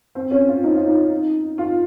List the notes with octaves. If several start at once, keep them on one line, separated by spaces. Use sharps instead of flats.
C4
C#4
F4
D#4
F4
D#4
F4